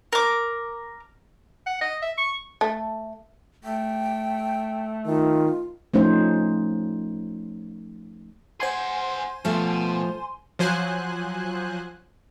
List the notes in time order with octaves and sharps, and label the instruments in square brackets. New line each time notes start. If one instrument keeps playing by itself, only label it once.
[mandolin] A#4 D6
[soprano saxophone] F#5
D#5
E5
C#6
[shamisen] A3
[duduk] A3 [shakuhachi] G5
[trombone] D#3 [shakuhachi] F4
[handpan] F3 A3 C#4 D#4 C5
[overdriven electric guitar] G#4 F#5 [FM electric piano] C5 G#5 C6
[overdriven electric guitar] B2 [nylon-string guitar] F3 A3
[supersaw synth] F3 F#3 C5 G#5 F#6